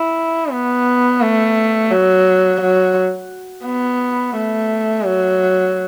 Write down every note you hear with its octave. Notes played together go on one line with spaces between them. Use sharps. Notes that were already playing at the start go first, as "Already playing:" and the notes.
Already playing: E4
B3
A3
F#3
F#3
B3
A3
F#3